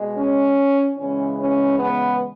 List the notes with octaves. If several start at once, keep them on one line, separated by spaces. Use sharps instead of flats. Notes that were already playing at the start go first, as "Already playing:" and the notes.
Already playing: B2 G#3
C#4
E2 C#3 E3 G#3 C#4
C#4
B3